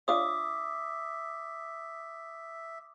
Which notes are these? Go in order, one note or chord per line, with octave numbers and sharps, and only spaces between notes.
D4 F4 C#5 E5 D6 D#6